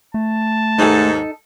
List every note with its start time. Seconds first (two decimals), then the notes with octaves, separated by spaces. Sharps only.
0.14 A3 A5
0.79 D#2 G#2 D#4 A4